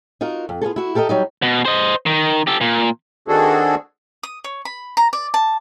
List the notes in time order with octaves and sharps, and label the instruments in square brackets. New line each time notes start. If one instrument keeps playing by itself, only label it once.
[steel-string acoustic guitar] D#4 F4 F#4 A#4
F2
B3 F4 G#4 A4
E4 F#4
G4 A4 A#4 C5 D#5
F#3 G3 D#4
[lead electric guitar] B2
C5 D#5
D#3
G4 A4
A#2
[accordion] D#3 C4 D4 F#4 G#4 A4
[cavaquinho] D#6
C#5
B5
A#5
D5
A5